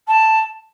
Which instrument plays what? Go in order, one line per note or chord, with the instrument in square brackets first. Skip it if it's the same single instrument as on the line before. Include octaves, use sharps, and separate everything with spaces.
[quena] A5